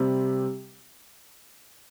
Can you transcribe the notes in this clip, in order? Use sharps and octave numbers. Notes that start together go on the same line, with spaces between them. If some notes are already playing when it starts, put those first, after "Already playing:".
Already playing: C3 G3 C4 G4